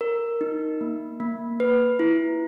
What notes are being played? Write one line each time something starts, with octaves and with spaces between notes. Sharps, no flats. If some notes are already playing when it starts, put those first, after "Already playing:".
A#4
D#4
A#3
A#3
B4
E4